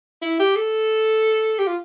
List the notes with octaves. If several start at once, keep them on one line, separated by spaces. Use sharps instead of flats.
E4
G4
A4
G4
F4